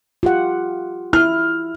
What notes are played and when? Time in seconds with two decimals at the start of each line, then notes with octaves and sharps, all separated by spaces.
0.23 F4 G4 F#5
1.13 E4 F6